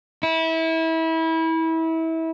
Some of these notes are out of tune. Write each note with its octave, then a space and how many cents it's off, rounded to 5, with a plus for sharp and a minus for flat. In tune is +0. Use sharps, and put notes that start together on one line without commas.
E4 -25